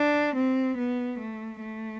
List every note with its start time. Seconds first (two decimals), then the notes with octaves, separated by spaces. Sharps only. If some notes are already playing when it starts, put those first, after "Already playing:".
Already playing: D4
0.35 C4
0.77 B3
1.19 A3
1.60 A3